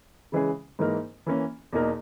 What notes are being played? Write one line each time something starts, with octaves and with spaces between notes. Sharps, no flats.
C#3 E3 G#3 C#4 G#4
G#2 E3 A#3 D#4 A#4
E3 A#3 C#4
E2 B2 A#3 D#4 A#4